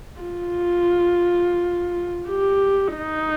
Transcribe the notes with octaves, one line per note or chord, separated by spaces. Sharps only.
F4
G4
D#4